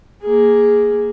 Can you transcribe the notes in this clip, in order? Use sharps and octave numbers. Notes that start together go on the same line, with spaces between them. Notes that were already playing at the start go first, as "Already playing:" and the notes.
A#3 G#4